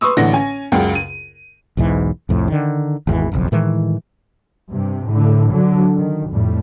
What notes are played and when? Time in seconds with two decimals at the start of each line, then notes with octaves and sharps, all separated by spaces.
0.01 B4 C6 C#6 D#6 E6
0.17 A1 D3 E3 F#5 A#6
0.33 C#4 G#5
0.72 C#2 F#2 C#3 F#5 G5
0.95 D#7
1.77 B1 E2 G#2 E3
2.29 C2 F2 A2
2.48 D3 D#3
3.07 G#1 E2 D3 E3
3.32 F#1 B1 F2
3.52 A2 D#3 E3 G#3
4.70 G2 C3
5.09 A2 D3
5.51 D3 F#3
5.95 D#3
6.30 F2 A2 G3